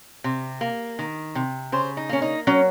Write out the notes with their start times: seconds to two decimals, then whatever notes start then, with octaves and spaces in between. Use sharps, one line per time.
0.24 C3
0.61 A#3
0.99 D#3
1.35 C3
1.72 C#3 C5
1.97 D#4
2.09 A#3 C#4
2.22 D#4
2.47 F#3 C#4